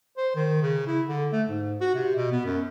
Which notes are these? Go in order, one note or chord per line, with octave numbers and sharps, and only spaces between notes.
C5
D#3
C#3
E4
D3
A3
G#2
F#4
C3
B2
B3
F#2